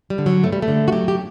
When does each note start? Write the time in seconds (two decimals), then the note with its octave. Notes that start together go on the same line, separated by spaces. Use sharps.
0.10 G3
0.18 D3
0.26 F#3
0.43 G2 A3
0.53 G3
0.62 A3
0.68 D3
0.88 F#4
0.92 F#3 G4
1.08 G4